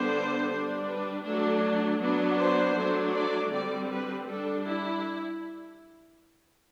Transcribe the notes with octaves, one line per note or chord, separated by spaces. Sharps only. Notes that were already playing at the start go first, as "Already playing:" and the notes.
Already playing: D3 G3 B3 D4 C5
G3 D4
B4
F#3 A3 D4 A4
F#3 B3 D4
C5
F#3 A3 D4
D5
D3 G3 C4 D5
B4
G3 D4 A4
E4